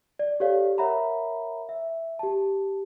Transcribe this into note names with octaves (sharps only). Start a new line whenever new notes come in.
D5
G4 A4 C#5 D5 F5
A#4 C#5 E5 F#5 A#5 B5
E5
G4 A5